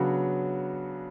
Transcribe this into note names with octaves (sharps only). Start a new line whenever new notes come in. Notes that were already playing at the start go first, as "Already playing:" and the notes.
Already playing: C#3 F#3 B3 D4 F#4